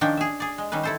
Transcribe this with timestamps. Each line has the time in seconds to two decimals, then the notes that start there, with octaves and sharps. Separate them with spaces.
0.01 D#3 F3 C#4 D4 G5
0.17 G#4 E5
0.40 G#4 D5
0.58 G#3
0.72 D#3 G3 C#4 B4
0.83 E4 A4 C5